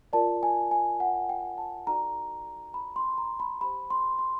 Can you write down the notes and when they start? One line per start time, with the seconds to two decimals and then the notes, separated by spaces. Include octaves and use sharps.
0.13 F4 A#4 D5 A5
0.43 G#5
0.71 G#5
1.00 F#5
1.29 G5
1.58 A5
1.87 D#4 F#4 A4 D5 A#5
2.74 B5
2.96 C6
3.18 A#5
3.40 B5
3.61 G4 C5 B5
3.90 C6
4.19 C6